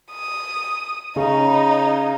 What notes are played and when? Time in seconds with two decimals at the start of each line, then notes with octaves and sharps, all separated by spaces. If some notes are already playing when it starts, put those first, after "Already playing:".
0.12 D#6
1.16 C#3 D#4